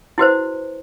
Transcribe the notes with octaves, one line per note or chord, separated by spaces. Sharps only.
E4 F#4 B4 C5